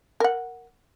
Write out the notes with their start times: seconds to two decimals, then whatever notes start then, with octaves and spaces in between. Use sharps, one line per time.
0.20 A#4 F#5